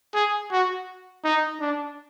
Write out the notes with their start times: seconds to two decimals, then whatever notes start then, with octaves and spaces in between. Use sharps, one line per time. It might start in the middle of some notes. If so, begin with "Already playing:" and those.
0.14 G#4
0.52 F#4
1.24 D#4
1.61 D4